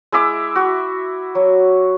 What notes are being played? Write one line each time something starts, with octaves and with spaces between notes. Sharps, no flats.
G#3 E4 E5 D6
F#4
F#3